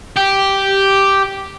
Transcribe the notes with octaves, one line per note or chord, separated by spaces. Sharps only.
G4